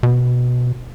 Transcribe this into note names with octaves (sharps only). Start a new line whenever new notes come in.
B2